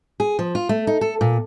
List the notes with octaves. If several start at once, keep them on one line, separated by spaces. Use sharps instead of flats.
G#4
F3
F4
A3
D#4
A4
A#2